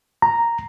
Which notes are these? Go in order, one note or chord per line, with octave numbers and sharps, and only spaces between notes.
A#5